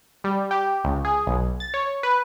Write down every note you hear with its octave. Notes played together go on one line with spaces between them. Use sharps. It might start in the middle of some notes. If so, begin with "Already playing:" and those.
G3
G4
C#2
G#4
B1
A6
C#5
B4